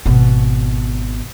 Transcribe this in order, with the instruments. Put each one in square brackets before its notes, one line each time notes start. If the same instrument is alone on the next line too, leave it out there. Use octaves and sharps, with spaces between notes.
[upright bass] G#1 B2